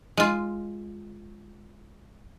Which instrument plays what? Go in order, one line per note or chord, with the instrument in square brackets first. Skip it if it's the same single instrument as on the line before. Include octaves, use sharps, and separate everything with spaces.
[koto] G#3 F4